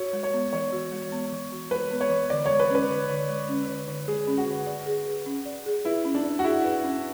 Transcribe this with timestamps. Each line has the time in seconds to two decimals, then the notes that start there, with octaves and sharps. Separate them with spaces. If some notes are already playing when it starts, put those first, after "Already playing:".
Already playing: F#4 C#5
0.13 G#3
0.23 C#5
0.33 B3
0.53 E3 C#5
0.72 F#4
0.92 G#3
1.12 B3
1.32 E3
1.52 F#4
1.71 G#3 B4
1.91 B3
2.01 C#5
2.10 E3
2.30 D3 D5
2.46 G#3 C#5
2.60 B4
2.70 C#4 B4
2.89 D3
3.09 D3
3.28 G#3
3.49 C#4
3.68 D3
3.88 D3
4.07 G#3 G#4
4.27 C#4
4.38 F#4
4.47 D3
4.66 D5
4.86 G#4
5.06 B4
5.26 C#4
5.46 D5
5.66 G#4
5.85 E4 B4
6.05 C#4
6.15 D4
6.24 D5
6.39 F#4
6.44 E4 G#4
6.64 B4
6.84 C#4